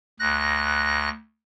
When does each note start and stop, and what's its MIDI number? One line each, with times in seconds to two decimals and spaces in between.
0.19 1.09 38
0.19 1.09 90
0.19 1.09 94